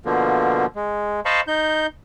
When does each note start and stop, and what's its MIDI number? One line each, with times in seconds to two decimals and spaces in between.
0.05 0.66 47
0.05 0.66 50
0.05 0.66 53
0.05 0.66 58
0.75 1.20 56
1.25 1.41 72
1.25 1.41 75
1.25 1.41 77
1.25 1.41 81
1.25 1.41 83
1.25 1.41 85
1.47 1.87 63
1.47 1.87 91